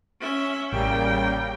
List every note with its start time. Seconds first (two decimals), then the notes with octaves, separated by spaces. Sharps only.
0.20 C#4 E5
0.72 A1 C#3 G3 A#3 G5